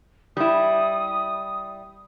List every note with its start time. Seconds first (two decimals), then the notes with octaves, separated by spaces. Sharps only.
0.37 G3 E4 D#6